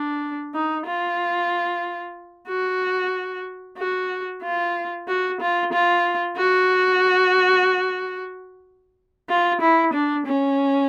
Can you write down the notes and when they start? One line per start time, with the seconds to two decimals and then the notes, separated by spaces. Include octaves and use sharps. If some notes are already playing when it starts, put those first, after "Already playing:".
Already playing: D4
0.55 D#4
0.86 F4
2.48 F#4
3.78 F#4
4.43 F4
5.08 F#4
5.41 F4
5.73 F4
6.38 F#4
9.30 F4
9.62 E4
9.94 D4
10.26 C#4